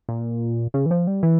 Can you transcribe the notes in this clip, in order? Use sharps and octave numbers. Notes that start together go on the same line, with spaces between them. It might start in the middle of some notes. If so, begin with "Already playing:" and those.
A#2
C#3
E3
F3
G3
E3